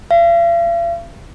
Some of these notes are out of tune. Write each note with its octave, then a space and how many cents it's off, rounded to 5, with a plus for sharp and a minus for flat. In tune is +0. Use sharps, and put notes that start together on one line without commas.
F5 -45